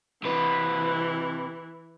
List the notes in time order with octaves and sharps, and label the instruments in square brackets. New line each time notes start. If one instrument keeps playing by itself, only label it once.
[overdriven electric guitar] C3 B4 [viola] E3